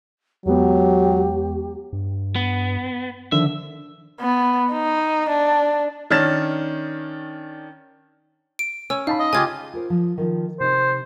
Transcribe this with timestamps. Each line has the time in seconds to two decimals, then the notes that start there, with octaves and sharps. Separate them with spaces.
0.46 E2 F#3 G#3 B3 G4
1.93 G2
2.36 B3
3.32 D3 D#3 F3 E5
4.20 B3
4.72 D#4
5.29 D4
6.10 D#3 C#4 D4 F6 A6 E7
8.59 D7
8.90 C#4 E6
9.07 D#4 F5 A5 B5
9.19 D#5
9.33 C#3 F4 G4 G#5 G#6
9.73 F4 A#4 C5
9.90 F3
10.18 D#3 F3 D#4
10.60 C3 D#4 C5